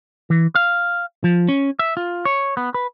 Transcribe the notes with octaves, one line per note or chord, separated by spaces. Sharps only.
E3
F5
F3
C#4
E5
F4
C#5
B3
B4